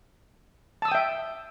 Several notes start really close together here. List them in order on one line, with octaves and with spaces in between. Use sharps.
A5 E6 D#6 G5 E5